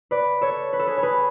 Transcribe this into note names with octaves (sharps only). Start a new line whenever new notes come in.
B4 D5
A4 C#5
B4
A4
G#4 B4
C#5
G#4 B4